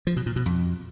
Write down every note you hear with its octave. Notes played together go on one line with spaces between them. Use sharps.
F3
B2
A#2
B2
F2